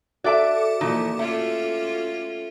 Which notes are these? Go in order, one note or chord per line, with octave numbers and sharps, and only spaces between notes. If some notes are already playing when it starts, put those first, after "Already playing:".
F#4 A4 D5 E5 A5 D6
A#2 E3 F3 D#4
A3 C#4 F4